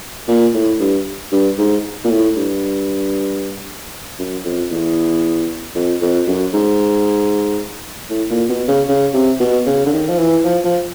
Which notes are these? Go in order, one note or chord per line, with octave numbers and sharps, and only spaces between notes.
A#2
A2
G2
G2
G#2
A#2
A2
G2
F#2
F2
E2
F2
F2
F#2
G#2
A2
A#2
B2
C#3
C#3
C3
B2
C#3
D3
D#3
F3
E3
F3
F3